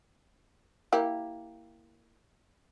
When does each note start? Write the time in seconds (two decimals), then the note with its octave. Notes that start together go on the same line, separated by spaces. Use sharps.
0.93 A#3 E4 G4